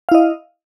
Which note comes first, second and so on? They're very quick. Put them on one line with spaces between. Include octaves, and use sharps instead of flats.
F5 E4 D#5